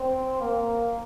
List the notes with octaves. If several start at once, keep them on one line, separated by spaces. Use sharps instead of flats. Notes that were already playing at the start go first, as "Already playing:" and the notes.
Already playing: C4
A#3